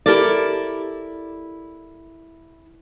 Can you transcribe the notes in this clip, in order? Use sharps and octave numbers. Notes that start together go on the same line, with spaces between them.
E4 G4 A4 A#4 D5